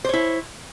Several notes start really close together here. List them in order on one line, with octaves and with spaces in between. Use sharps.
C5 C#5 E4